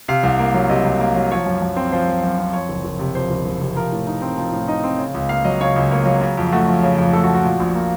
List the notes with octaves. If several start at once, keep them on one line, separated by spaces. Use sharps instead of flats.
C3 F5
C2
A#3
F#3
C3 D#5
C2
A#3
F#3
F3 C#5
F#2
F#2
C4
F3 C5
F#2
F#2
C4
F2 C#5
F#1
F#1
C3
F2 C5
F#1
F#1
C3
F3 A#4
A2
D#4
C4
F3
A2
D#4 D#5
C4
C#3
C#2
A#3 F5
F#3 D#5
C#3 C#5
C#2
A#3 C#5
F#3
C#3
F2
A3 F#4
F3
C#3
F2
A3 A4
F#4
F3
F#4
A#2
A#1
A#3